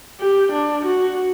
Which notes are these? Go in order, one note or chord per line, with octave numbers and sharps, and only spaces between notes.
G4
D4
F#4